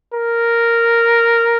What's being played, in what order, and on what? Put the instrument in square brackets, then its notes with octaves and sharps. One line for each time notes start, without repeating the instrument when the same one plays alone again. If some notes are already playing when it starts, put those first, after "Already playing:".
[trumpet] A#4